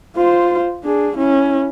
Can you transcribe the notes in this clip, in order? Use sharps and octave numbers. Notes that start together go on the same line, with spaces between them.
F4 C5
D4 G#4
C#4 E4